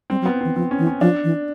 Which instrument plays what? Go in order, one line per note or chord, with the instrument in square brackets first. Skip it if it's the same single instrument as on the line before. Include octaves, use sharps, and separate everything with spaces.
[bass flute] G3 [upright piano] C4
[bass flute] F#3
[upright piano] B3
[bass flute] E3 [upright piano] C4
[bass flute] F3 [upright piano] C4
[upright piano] C#4
[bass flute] E3
[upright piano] C#4
[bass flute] F3 [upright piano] D4
[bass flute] E3